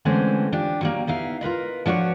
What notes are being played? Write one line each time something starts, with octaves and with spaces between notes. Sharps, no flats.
D3 E3 G#3 A3 C4 C#4
D4 F4 G4
F#3 G3 A#3
B3 D#4 E4 F5
F4 A#4 B4 D#5
F3 D4 F#4 B4 C#5